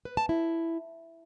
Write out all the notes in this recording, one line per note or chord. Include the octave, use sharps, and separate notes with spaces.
B4
A5
E4